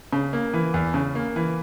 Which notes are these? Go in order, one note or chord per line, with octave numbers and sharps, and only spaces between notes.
C#3
A#3
E3
E2
C#3
A#3
E3